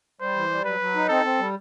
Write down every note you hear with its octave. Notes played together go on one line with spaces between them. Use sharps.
G3 C5
E3
G3
F#3 B4
F#3
D#4
C4 A4
C4
G3